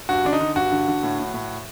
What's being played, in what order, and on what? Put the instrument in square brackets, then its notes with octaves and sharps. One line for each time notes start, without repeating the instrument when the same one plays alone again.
[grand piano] G2 F#4
D3 D4
D#4
D3
G2 F#4
D3
D3
A2
A2
A2